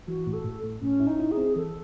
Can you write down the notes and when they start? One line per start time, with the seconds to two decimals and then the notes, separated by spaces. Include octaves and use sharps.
0.08 E3 F#4
0.27 A2
0.33 A4
0.44 A2
0.64 A2
0.81 A2 C#4
1.00 E4
1.07 D#4
1.19 E4
1.31 G#4
1.37 C4
1.56 E3 A4